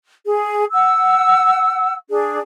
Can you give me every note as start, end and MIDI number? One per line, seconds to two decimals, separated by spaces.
0.25 0.63 68
0.72 1.93 78
0.72 1.93 88
2.09 2.38 62
2.09 2.38 68